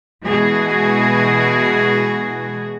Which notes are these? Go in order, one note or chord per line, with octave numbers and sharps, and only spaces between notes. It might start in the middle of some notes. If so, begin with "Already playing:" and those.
B2 E3 G#3 F#4 G#4